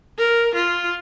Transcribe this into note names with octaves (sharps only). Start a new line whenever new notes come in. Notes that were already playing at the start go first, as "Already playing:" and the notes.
A#4
F4